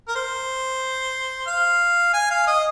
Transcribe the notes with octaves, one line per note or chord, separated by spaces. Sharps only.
A#4
C5
F5
G#5
F5
D#5